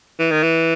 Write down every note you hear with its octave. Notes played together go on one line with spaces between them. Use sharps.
E3
D#3
E3